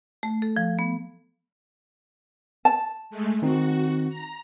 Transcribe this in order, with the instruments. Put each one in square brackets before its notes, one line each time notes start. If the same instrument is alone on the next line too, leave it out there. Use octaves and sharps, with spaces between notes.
[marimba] A3
A4
F3
B3
[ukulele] A5
[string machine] G#3 A3
[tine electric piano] D#3 C4 D#4 [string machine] F#4
[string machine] A#5